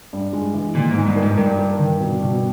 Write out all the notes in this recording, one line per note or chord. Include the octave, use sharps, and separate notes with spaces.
G2
G#3
E3
A#2 D#3
G#2 D#4
G2
A#4
G#2
G2 A#4
A#4
D#3
B2
B2